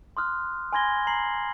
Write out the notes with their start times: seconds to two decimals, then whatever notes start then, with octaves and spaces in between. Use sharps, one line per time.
0.17 C6 D#6 F6 F#6
0.73 G#5 B5 C6 G#6 A#6 G7
1.07 A#5 C7 F#7